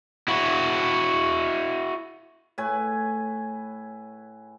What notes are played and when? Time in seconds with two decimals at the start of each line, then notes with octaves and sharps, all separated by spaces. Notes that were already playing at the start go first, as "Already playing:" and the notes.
0.28 E4 F#4
2.58 A2 B4 G#5